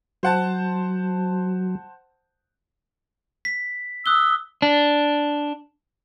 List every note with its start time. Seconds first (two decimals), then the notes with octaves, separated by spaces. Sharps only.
0.23 F#3 C5 F#5 A5
3.45 B6
4.06 D#6 E6 F#6 G7
4.62 D4